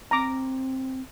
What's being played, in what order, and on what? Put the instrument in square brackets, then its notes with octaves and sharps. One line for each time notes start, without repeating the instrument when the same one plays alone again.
[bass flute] C4 [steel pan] A#5 D6